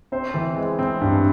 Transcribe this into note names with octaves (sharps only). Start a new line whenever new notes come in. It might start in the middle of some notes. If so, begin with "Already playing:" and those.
C4 C5
E3
G#3
C4
G2